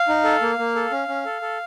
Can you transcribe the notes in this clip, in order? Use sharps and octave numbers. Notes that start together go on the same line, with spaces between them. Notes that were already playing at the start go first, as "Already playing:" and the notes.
Already playing: F5
D#4
A4
A#3
A#3
A4
C#4
C#4
A4
A4